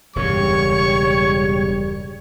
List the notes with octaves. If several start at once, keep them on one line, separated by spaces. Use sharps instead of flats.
E1 G2 C#3 G3 C#5 C#6